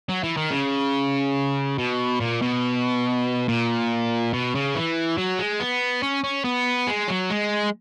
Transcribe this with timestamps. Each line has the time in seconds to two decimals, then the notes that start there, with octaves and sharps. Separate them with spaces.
0.09 F#3
0.23 E3
0.37 D#3
0.51 C#3
1.79 B2
2.20 A#2
2.42 B2
3.48 A#2
4.33 B2
4.55 C#3
4.75 E3
5.18 F#3
5.39 G#3
5.60 B3
6.02 C#4
6.24 C#4
6.45 B3
6.87 G#3
7.08 F#3
7.30 G#3